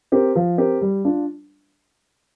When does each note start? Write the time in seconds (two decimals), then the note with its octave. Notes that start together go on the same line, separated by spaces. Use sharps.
0.12 C4 G4 A#4
0.35 F3
0.58 C4 G4 A#4
0.81 G3
1.05 D4 F4